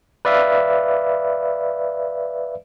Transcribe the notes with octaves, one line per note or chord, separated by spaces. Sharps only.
B4 D5 E5 F5